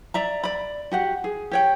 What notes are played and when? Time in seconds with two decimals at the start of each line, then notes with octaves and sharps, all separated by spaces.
0.14 D5 E5 A#5
0.43 D5 B5
0.92 F#4 G4 F#5
1.24 G#4
1.51 G4 C#5 G5